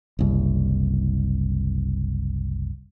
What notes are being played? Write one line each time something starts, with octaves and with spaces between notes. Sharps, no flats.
F#1 C2